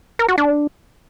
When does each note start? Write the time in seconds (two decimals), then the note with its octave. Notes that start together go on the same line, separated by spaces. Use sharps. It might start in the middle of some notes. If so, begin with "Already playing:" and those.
0.19 A#4
0.28 F#4
0.38 D4